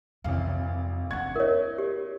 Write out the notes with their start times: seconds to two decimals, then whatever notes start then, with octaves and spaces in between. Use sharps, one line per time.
0.24 G#1 F2 C3 E3 F5
1.11 C4 D4 F#5 C#6 G#6
1.36 E4 A#4 B4 C#5 D#5
1.78 G4